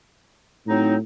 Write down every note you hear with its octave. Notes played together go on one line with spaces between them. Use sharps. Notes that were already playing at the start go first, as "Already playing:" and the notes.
A2 F#3 C4 D#4